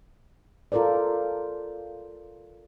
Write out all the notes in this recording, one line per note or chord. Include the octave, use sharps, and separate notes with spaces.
F4 A4 A#4 C5 D5